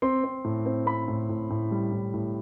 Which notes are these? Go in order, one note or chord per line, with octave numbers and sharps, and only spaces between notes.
C4 C6
C4
A2
C4
C4 B5
A2
A2
A2
G3
A2
A2